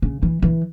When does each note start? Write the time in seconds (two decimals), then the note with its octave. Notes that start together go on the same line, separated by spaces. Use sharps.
0.02 C#3
0.23 E3
0.42 E3